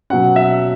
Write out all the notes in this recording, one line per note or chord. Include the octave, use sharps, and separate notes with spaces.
B2 F#3 C#4 F#5
E5